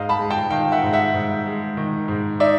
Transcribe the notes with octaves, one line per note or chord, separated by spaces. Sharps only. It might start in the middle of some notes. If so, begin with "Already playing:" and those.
Already playing: G#2 D#5 F5
A5 B5
G#3
G5 A5
D#3 F5 G5
E5 F#5
G#2
E5 F#5
G#2
G#3
D#3
G#2
D#4 D5 E5